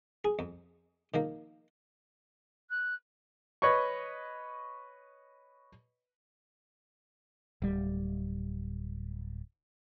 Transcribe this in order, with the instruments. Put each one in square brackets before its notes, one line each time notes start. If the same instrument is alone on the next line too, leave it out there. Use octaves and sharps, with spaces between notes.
[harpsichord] G#4
F2
D#3 F3 A#3
[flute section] F#6
[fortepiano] B4 C#5 D#5 C#6
[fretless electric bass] D1 G3